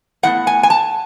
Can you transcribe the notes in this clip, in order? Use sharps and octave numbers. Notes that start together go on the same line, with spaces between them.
A2 G#3 B3 F#5
G#5
G#5
A5